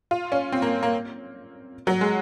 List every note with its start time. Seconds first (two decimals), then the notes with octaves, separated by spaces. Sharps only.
0.11 F4
0.32 C#4
0.52 C4
0.62 A#3
0.83 A#3
1.87 F#3
2.01 G#3